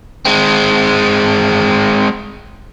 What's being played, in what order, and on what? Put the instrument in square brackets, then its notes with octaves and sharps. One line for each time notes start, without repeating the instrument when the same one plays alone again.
[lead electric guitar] G#3 C4